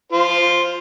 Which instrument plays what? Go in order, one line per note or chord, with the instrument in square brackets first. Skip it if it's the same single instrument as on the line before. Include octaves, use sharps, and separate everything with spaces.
[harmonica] F4 C5